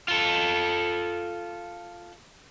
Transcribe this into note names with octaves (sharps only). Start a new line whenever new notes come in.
F4 A4